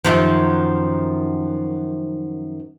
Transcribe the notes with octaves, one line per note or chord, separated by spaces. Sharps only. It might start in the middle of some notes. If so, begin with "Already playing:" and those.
F#2 D#3 F3